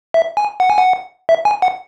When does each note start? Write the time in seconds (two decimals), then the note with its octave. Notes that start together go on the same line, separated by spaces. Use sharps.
0.14 E5
0.37 G#5
0.60 F#5
0.70 G#5
0.78 F#5
1.29 E5
1.45 G#5
1.62 F#5